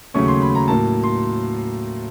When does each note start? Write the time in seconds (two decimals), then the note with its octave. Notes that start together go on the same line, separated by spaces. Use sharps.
0.14 D#2 C#3 F#3 A3 C#4 C#6
0.28 C6
0.42 B5
0.55 A#5
0.68 A2 F#3 A#3 A5
1.03 C6